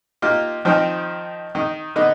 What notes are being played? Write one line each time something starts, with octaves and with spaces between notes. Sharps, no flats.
A#3 D#4 F4 G4
D#3 F3 C4 D#4 G5
D#3 D#5
D3 B3 D#4